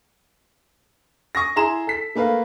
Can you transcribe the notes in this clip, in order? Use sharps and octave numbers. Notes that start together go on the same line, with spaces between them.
C#6 D#6 A#6
E4 G#4 A#5 C6 E7
A4 B6
A3 A#3 B4 F5